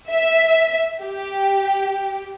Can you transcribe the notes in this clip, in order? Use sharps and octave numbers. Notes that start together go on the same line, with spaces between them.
E5
G4